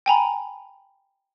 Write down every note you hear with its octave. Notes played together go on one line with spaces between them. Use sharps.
G5 G#5 A#5 B5